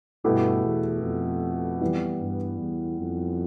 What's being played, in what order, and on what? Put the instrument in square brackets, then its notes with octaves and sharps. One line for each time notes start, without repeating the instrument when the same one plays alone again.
[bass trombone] G2 [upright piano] B2 A3 E4 G4
[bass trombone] E2
F2
[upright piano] E3 G3 B3
[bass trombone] G2
E2
F2